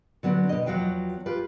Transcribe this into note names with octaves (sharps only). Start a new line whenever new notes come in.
D3 F#3 B3 C4 D4
B2 D#5
E2 F3 F#3 F#4 F5 G5
F4 G4 B4